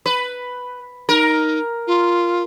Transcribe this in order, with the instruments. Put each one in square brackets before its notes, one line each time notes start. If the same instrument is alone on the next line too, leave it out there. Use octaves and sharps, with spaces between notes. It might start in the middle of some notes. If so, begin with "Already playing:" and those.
[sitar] B4
[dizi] D#4 [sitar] A#4
[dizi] F4